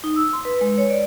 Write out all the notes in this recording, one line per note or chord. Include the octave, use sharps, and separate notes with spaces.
D#4
E6
C6
B4
G#3
C#5
D5